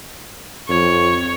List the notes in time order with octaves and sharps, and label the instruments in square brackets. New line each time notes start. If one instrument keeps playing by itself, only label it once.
[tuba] F2 [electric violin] C#5